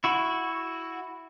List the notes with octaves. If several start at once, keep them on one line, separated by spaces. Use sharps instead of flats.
E4 F#4